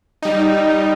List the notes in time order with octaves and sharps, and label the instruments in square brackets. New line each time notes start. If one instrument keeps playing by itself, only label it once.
[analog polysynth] G3 D#4